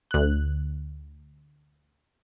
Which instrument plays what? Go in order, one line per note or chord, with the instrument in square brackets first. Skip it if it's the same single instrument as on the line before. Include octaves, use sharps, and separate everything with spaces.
[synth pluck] D2 F#6